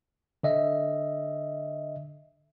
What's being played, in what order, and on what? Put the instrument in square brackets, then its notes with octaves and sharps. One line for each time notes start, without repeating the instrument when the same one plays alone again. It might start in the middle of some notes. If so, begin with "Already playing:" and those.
[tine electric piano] D3 D#5 E5